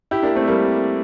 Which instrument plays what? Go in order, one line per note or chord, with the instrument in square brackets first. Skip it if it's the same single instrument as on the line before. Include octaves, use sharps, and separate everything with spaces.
[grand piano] E4 G4
A#3 D4
A3 C4
G3 A#3